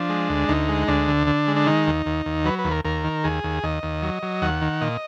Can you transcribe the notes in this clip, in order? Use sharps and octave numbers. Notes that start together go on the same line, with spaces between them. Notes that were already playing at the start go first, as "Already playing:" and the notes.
Already playing: F3 D4
G#3
D2
D2 D#4
G#3
D2 D4
D3
D3
G#3
D4
D#3 D#4
D#2
D#2
D#2
F#3 B4
B4
D#2
A#4
D#2 A#4
D#3
D#2 G#4
D#2
D#2 D#5
D#2
F#3
F#3
D#2 F#5
D#3
A#2 D#5